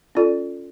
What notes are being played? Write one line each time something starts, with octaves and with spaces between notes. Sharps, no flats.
C#4 F4 A4 D5